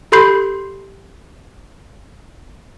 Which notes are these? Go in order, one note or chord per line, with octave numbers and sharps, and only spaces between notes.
G4 A4 B5 C6 G6 C7